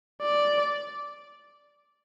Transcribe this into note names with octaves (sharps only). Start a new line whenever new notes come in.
D5